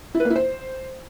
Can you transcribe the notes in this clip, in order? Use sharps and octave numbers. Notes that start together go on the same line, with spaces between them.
E4
B4
A#3
E4
C5